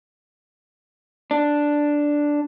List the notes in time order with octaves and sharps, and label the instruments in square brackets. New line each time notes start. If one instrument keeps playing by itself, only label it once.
[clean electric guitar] D4